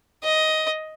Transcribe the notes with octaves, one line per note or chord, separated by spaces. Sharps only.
D#5